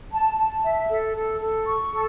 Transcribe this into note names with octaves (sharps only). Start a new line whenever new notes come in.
A5
A5
E5
A4
A4
A4
C#6
A4